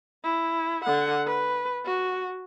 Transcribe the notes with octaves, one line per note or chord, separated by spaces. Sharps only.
E4
D3 F#5
B4
F#4